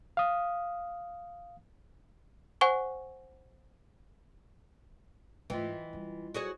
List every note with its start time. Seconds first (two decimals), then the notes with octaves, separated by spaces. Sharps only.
0.17 F5 D#6
2.61 C5 F#5 G#5 C#6
5.50 G#2 E3 A3 F4 D#5 G5
5.72 F#3
5.93 F#2 G3
6.34 F#4 G#4 C#5